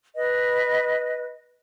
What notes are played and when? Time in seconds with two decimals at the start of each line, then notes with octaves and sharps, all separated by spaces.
0.15 B4 D#5